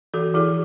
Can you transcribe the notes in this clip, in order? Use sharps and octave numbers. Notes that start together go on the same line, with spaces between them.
E3 F#4 A4
E3 E4 G#4